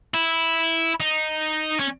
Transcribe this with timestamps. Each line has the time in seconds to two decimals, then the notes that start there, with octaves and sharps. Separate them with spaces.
0.14 E4
1.00 D#4
1.80 C#4